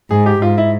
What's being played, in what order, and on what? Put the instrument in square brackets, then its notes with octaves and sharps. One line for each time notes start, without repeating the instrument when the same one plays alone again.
[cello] G#2 [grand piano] G#4
[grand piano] G4
[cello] G#2 [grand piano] F4
[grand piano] E4